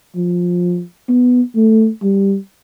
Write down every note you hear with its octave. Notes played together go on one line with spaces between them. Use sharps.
F3
B3
A3
G3